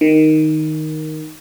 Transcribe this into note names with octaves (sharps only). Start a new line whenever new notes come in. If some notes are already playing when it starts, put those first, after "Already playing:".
D#3